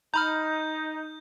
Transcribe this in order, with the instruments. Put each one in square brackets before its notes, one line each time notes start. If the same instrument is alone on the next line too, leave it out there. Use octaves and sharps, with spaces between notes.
[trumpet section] D#4 [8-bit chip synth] A#5 B5 F6 [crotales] G6